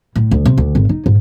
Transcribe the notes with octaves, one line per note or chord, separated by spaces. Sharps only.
A2
D2
C3
D2
G#1
D#4
G#2